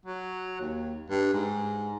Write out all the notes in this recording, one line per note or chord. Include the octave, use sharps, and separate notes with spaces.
F#3
D#2
G2
G#2